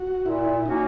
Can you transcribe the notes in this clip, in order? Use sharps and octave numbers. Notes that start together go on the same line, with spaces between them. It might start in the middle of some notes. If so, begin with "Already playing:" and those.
Already playing: F#4
A#2 E4
F#3 A#3 C#4 D#4 F#4